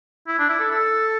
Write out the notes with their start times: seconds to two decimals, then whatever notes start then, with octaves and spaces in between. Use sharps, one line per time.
0.28 E4
0.39 D4
0.49 E4
0.59 A4
0.71 A4